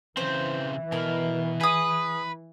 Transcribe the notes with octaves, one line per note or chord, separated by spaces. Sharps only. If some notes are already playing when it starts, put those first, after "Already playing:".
C#3 E3 C4 C5
B2 A#4
G#4 B4 D#6